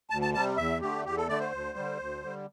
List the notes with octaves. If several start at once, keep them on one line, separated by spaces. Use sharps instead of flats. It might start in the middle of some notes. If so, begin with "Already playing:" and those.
D2 A5
A5
C3 G3 A5
E2 E5
D3 A3 G4
E2 G4
A4
D3 A3 D5
C5
D2
D3 G3
D2
D3 G3